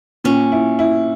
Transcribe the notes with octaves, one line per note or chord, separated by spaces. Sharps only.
A#2 C#4
E4
E4